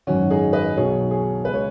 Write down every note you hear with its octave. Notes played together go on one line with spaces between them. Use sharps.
G#1 F#2 D#3 C#4 F#4
D#4 G#4
B4 D#5
B1 B2 F#3 G#4 C#5
G#4 C#5
C#2 C#3 G#3 B4
C#5